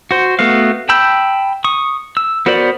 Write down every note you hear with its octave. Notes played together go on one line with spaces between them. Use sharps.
F#4 C5
A3 B3 F#4 F5
G5 A5 B5 E6 G6
C#6 D#6
E6
B3 F#4 A#4 C5 D5